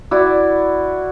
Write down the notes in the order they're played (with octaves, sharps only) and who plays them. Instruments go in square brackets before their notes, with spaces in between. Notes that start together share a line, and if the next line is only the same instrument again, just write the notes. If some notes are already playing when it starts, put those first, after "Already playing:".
[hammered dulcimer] E4 F#4 D5